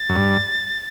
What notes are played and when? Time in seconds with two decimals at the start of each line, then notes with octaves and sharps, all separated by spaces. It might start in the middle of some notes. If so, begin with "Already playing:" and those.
Already playing: A6
0.09 F#2
0.16 G2